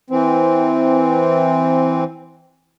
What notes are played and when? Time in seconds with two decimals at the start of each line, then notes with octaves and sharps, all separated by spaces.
0.10 E3 C4